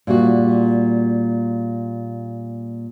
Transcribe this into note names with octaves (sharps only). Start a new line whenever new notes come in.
A#2 G3 F#4